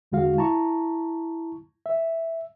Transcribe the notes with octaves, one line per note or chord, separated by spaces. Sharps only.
E2 D3 G#3 F#4 F5
E4 A5 A#5 C#6
E5